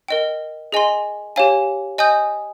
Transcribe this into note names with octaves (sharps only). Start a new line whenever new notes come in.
A#4 D#5 G5
G#4 D#5 G#5 C6
G4 C#5 F5 G#5
D#5 G#5 D#6 G6